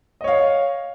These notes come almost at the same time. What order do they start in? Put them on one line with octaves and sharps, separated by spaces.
D#5 C#5 F5